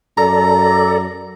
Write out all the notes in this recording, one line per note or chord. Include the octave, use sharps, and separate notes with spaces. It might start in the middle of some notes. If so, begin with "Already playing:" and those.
F#2 A4 D5 A#5